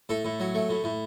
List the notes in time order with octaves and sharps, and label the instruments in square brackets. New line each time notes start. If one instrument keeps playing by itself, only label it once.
[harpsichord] A2 A4
A2
F#3
A3
A2
A2